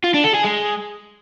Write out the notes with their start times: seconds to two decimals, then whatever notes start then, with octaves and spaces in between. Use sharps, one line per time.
0.04 F4
0.14 D4
0.24 A4
0.34 G#4
0.44 G#3